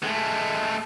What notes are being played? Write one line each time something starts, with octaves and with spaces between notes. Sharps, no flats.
G#3 A3